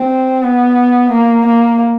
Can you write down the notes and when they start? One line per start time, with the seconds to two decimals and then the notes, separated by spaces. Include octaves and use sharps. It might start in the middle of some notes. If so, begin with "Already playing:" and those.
Already playing: C4
0.43 B3
1.11 A#3
1.46 A#3